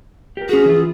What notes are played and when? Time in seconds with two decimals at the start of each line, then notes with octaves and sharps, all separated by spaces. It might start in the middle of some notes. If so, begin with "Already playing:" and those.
0.37 G4 A#4
0.49 C#4 F#4 G#4
0.66 E3 E4 F4